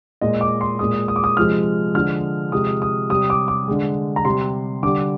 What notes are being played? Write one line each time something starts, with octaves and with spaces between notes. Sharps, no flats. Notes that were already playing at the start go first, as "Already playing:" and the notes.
A#2 G#3 D#5
D6
C6
A#2 G#3 D#6
D#6
D6
D#6
C3 F3 G#3 F6
D3 F3 G#3 F6
C3 F3 G#3 D#6
D#6
C3 G3 D#6
D6
D6
D3 G#3
A#5
C3 G3 C6
D3 G3 D6